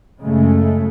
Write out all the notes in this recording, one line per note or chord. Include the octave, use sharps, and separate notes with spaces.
F#2 C#3 G#3 A3